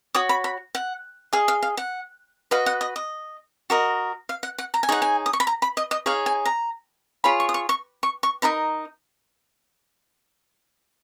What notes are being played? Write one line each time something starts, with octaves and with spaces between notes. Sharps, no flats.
F#4 C#5 D#6
B5
B5
F#5
G#4 D#5 F5
F5
F5
F#5
F#4 B4 D#5 F5
F#5
D#5
D#5
F#4 A#4 D#5
F5
F#5
F#5
A#5
G#5
D#4 G#4 C#5 F#5
G#5
D#6
C#6
B5
A#5
B5
D#5
D#5
D#4 G#4 C#5 F5
G#5
A#5
F4 G#4 C#5 B5
C#6
D#6
C#6
C#6
C#6
C#6
D#4 A#4 D#5 B5